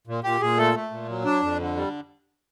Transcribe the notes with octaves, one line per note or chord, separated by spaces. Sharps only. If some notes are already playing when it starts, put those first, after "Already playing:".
A#2
A#2 G4
A#2 G#4
A3 A4
A3
A#2
F#3
D4
F2
D3
G3